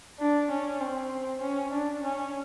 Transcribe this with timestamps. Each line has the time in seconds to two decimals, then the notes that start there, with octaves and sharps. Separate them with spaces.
0.20 D4
0.51 C#4
0.81 C4
1.41 C#4
1.73 D4
2.03 C#4